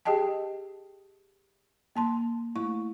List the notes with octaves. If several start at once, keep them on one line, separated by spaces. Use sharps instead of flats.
G4 G#4 D#5 G5 A5
A#3 A5 C6
A3 E4 C#6